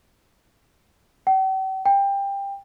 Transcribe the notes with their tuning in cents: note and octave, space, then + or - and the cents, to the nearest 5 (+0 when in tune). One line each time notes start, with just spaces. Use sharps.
G5 -45
G5 +20